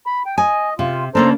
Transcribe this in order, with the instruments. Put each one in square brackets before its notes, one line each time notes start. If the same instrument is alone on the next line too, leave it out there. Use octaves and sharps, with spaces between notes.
[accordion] B5
G5
[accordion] D#5 [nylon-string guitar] G#5
[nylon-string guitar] C3 [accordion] F4
[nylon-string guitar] C#3 A#3 D4 [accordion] A4 C5 A#5